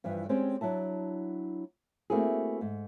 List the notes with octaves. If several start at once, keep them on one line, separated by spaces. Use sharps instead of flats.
G2 E3 F3
G#3 C4 C#4 G4 C5 D5
F#3 D4 E4 A5
A3 A#3 C4 E4 F#4 G#4
G#2